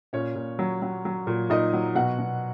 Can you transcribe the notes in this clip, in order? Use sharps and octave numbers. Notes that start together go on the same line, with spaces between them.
A#2 C#4 C#5
A#2
F#3
F#3
F#3
A#2
A#2 D#4 D#5
F#3
B2 F#4 F#5
B2